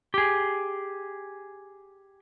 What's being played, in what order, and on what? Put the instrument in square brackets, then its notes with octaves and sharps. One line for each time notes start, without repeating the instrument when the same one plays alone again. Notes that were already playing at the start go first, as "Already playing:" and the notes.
[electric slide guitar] G4 G#4